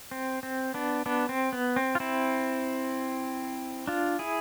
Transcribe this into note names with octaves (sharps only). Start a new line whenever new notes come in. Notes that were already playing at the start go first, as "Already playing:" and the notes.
C4
C4
B3 D4
B3 D4
C4
B3
C4
F4
C4 E4
D4 F4
E4 G#4